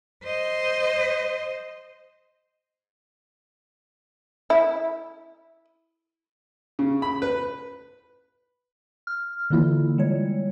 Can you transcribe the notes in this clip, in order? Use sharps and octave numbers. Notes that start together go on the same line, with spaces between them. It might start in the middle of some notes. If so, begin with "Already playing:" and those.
C5 D#5
E4
C#3
B5
B4
F6
D3 E3 A#3 E4 F4
G3 G#3 C#5